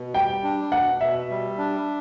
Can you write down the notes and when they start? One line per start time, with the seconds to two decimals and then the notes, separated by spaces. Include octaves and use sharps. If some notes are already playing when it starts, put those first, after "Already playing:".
Already playing: B2
0.15 G3 G5
0.43 D4
0.72 B2 F#5
1.01 B2 E5
1.30 G3
1.58 D4